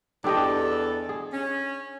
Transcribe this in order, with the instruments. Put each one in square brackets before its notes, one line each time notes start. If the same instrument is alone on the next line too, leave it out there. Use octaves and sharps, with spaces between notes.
[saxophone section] E2 A4 [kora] D4 G4 D#5
[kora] G#4
[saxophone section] C#4